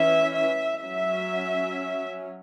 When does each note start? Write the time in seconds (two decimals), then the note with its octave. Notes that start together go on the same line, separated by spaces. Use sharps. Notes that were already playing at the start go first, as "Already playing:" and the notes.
Already playing: E3 C#4 E5
0.34 E5
0.81 F#3 C#4 E5